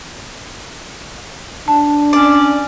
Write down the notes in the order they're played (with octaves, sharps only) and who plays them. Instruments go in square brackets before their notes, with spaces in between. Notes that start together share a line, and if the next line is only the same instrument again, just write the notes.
[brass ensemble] D4 [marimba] A5
[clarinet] C#4 [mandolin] D5